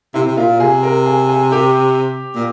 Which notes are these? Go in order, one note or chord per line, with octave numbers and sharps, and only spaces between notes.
C3 E4
C3
A#2 F4
C3 G#4
A#4
G#4
G#4
G4
A#2